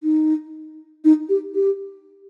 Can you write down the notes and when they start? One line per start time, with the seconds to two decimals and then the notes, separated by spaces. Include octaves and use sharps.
0.03 D#4
1.05 D#4
1.29 G4
1.55 G4